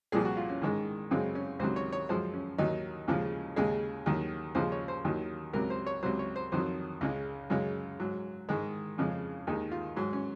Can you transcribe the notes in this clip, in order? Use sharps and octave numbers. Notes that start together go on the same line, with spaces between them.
C2 A#2 F3 G#4
F#4
F4
C#4
G#2 D#3 G#3
F#2 C#3 G#3 C4
C#4
C#2 C3 D#3 F#3 C5
C#5
C#5
F#2 F3 G#3 C5
C#4
D#2 D#3 F#3 D#4
D#2 C#3 F3 G#3
D#2 C#3 G#3 G#4
D#2 D#3 F#3
D#2 C#3 F3 G#3 C5
C#5
C5
D#2 D#3 F#3
C#2 C3 F#3 A#4
C5
C#5
C#2 C3 F#3 C5
C#5
C5
F2 D#3 F#3 C5
C#2 C#3 G#3
F#2 C#3 G#3
G#2 F#3
G#2 D#3 G#3
F2 C#3 F3 G#3
D#2 D#3 G#3 D#4
F4
G#2 F#3
C#4